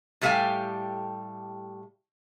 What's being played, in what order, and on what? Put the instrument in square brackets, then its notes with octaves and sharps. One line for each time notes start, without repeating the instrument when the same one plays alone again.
[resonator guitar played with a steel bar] A2 G3 A3 G4 F5 G#5